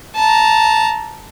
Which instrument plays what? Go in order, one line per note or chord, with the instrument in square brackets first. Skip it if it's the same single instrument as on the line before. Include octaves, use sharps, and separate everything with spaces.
[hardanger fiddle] A5 A#5